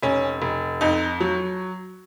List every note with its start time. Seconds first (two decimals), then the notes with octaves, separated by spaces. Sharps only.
0.03 F1 C#4
0.42 F1
0.81 F2 D#4
1.20 F#3